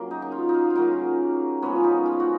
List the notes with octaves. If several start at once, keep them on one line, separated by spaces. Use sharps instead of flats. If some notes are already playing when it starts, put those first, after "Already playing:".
Already playing: C#3 F#3 A#3
D#4
D#4
F4
D#4
F4
F4
C#3 F#3 A#3 D#4
A#2 F3 G#3 B3 C#4
F4
D#4
F4
F#4